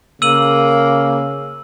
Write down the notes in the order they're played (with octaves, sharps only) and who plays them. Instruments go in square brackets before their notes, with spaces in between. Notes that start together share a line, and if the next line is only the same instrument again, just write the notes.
[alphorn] C#3 [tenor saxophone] A#3 [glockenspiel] E6 D#7 F#7